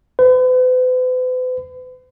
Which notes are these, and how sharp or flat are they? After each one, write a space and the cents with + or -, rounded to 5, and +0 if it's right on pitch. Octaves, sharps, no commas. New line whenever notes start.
B4 +45